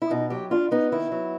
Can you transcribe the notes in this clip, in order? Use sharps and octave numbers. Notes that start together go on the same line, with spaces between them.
E4
B2 D#4
F#3 G4
D4 F4
B3 D#4
D#3 E4
F#3